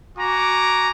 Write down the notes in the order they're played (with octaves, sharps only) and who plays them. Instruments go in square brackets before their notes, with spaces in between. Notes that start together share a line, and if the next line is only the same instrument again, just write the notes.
[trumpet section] F#4 G#5 A#5 D6